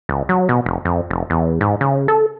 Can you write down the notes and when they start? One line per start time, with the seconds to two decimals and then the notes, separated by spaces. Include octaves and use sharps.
0.09 C#2
0.29 F#3
0.49 B2
0.66 F1
0.85 F2
1.10 F1
1.30 E2
1.61 G#2
1.81 C#3
2.08 A4